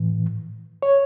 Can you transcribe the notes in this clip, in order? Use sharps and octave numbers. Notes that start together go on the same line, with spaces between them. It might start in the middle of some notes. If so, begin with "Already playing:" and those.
Already playing: A2 E3
C#5